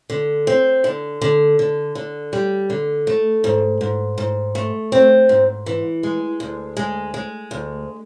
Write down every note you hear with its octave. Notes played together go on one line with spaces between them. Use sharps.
D3
C4
D3
D3
D3
D3
G3
D3
A3
G#2
G#2
G#2
A3
C4
G#2
E3
G#3
D2
G#3
G#3
D2